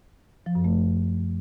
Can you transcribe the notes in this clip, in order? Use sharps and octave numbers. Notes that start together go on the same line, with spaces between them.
F3
F#2
A3